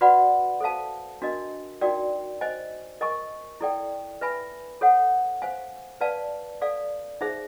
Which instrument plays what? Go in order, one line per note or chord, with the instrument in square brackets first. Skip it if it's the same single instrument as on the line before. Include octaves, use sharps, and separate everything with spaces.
[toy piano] F#4 B4 D5 F#5 B5
A4 C5 F5 A5
D4 F#4 A#4 D#5
D#4 F#4 A#4 D5 G5
C5 D#5 G#5
A#4 D#5 G#5 C#6
E4 A4 D5 G5
B4 E5 G#5 B5
A4 C#5 F#5
C5 F5 G#5
B4 D5 F5 A5
A4 D5 F5
D#4 G#4 C5 E5